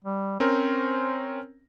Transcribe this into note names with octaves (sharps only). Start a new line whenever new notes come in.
G3
C4 C#4 A#4 C5